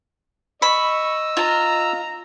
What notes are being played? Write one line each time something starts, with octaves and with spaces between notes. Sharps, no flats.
D#5 B5 C#6 E6
F4 A#5